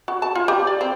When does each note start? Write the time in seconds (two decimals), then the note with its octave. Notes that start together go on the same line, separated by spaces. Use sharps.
0.08 F#4
0.22 A5
0.35 F4
0.48 G4
0.67 D5
0.81 C4